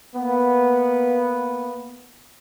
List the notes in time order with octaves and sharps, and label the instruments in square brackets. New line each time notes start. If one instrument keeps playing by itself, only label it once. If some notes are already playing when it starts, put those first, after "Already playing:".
[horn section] A#3 B3